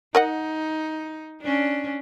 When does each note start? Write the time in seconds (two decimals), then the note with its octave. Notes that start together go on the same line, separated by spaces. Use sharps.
0.15 D#4 A#4 D#5 F#5
1.42 C#4 D4